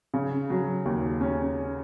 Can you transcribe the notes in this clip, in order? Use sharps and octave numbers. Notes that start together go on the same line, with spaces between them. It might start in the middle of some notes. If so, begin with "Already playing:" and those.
C#3
F#3
D#2
C#4